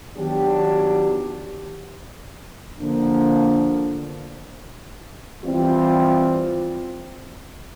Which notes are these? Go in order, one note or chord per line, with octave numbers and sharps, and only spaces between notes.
D#3 F#3 B3 D4 G4
D3 F3 A#3 D4
E3 G3 C4 F4